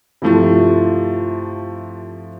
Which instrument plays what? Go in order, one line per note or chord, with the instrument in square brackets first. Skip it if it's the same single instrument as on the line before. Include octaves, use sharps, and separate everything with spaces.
[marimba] G2 E4 F4 [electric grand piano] C3 F3 A3